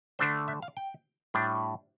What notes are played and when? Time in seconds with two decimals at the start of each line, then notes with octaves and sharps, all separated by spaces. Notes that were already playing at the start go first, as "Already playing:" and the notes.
0.19 D3 A3 D4 C5
0.48 E5
0.62 F5
0.77 G5
1.34 A2 G3 D4